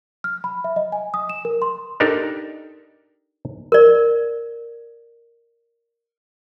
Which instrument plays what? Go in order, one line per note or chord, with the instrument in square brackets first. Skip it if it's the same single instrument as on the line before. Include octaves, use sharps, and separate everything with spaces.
[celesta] F6
B5
E5
D#5
G#5
D#6
E7
A#4
C6
[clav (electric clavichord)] D4 D#4 G4 A4 A#4
[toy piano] A#4 D5